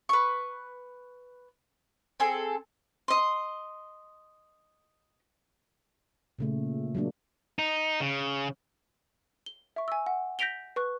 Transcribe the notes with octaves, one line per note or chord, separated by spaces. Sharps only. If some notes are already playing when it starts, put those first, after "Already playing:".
B4 C#6
C4 G#4 A4
D#5 C6
A#2 C#3 A3
F#3 G#3 A#3 D4
D#4
C#3
G7
E5 C#6
G#5 E6
F#5
G6 A#6 B6 D7 F7 G7
B4 C#6 F#6